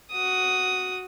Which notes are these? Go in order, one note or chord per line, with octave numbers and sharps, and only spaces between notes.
F#4 D#6